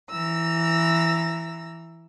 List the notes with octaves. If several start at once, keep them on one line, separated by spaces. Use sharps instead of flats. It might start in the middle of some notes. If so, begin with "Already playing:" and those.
E3 A#5 E6